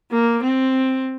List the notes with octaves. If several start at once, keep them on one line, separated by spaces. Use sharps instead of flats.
A#3
C4